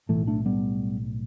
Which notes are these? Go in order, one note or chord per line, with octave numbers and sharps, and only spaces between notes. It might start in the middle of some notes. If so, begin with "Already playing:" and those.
B1 A2 E3 A3
A3 D4
G3 B3